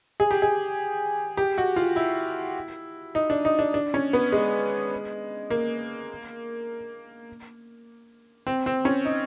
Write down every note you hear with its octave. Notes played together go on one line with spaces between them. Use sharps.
G#4
G4
G#4
G4
F#4
F4
E4
D#4
D4
D#4
D4
D4
C#4
B3
G#3
A#3
C4
C4
C#4
D#4